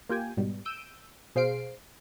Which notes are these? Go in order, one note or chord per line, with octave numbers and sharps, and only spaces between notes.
A#3 F4 G4 G5 G#5
G#2 B2 G3
E6 G6 D7 D#7
B2 G#4 C5 F5 C7 D7